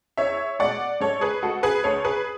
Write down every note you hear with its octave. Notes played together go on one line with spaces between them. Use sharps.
E2 C#5 E5
B2 G#3 D5 F#5
G#2 A4 C#5
G#4 B4
G#3 F#4 A4
G#4 B4
D2 A4 C#5
G#4 B4